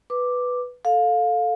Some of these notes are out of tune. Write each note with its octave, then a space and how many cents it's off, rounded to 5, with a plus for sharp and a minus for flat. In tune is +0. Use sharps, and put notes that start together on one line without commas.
B4 +0 D6 +0
A4 +0 F5 +20